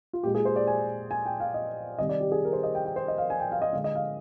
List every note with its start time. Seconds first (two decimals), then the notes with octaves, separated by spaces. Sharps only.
0.13 F4
0.23 A#2 G#3 G4
0.35 G#4
0.45 C5
0.56 D5
0.67 G#5
1.11 G#5
1.26 G5
1.40 F5
1.54 D#5
1.98 C3 D#3 G3 D#5
2.09 D5
2.20 G4
2.32 G#4
2.45 A#4
2.53 C5
2.63 D#5
2.75 G5
2.85 G5
2.96 C5
3.08 D#5
3.18 F5
3.30 G#5
3.40 G5
3.52 F5
3.62 D#5
3.73 D3 G#3 F5
3.84 D#5
3.95 F5